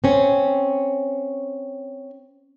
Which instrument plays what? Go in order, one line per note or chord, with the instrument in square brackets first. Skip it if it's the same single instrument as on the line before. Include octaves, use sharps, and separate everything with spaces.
[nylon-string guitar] C4 C#4